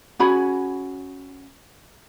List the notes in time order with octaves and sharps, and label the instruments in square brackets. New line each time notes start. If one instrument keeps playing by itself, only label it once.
[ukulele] C#4 F#4 G#4 B5